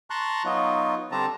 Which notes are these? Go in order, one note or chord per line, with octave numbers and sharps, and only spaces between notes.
A5 A#5 C6 C#6 F#6
F#3 B3 D#4 F4 F#4
D3 G3 C4 D4 A5 A#5